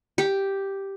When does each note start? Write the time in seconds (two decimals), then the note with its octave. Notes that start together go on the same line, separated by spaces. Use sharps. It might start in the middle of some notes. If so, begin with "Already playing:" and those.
0.18 G4